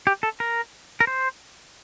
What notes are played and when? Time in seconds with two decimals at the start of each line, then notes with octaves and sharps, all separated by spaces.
0.07 G4
0.23 A4
0.40 A#4
1.00 A#4
1.07 C5